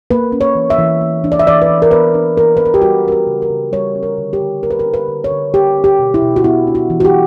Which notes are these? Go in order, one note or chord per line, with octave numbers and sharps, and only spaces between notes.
A#3 B4
C#4
C#5
E3
E5
E3
A#3
D4
D5
E5
E3 D5
B4
E3
A#4
B3 B4
D4
E3 A#4
E3 B4
A#4
G4
G3 F#4
C#4 A#4
G4
C#3
A#4
C#3
G3 C#5
C#4
A#4
D3
G4
D3
A#3 A#4
B4
A#4
D4
B4
D3
C#5
D3
A#3 G4
C#4
G4
B2
E4
B2
F#4
B3 E4
D4
F#4
E3
F#4
G4